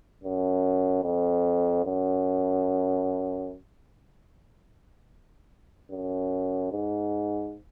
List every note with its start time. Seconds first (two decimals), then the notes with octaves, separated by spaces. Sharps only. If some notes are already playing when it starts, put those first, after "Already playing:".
0.24 F#2
1.04 F2
1.85 F#2
5.91 F#2
6.72 G#2